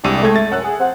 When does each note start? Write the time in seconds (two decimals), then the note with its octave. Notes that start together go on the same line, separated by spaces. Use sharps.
0.04 C2 G#3 D4 G4 E6 D#7
0.24 G#3 A3 G5 G#6
0.36 A6
0.52 F#2 F#5 E6 F#6
0.64 G#4
0.80 F3 C4 F#5